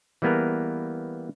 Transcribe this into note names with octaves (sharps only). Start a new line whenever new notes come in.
E3 G3 A#3 B3 G#4 A#4